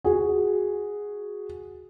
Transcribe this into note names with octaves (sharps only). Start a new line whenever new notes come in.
F#4 G#4